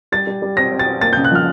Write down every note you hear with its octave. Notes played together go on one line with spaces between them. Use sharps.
G3 A6
G3
G3
C4 A#6
C4
A6
C4
A#3 A6
G6
C#3
F#6
F3 F6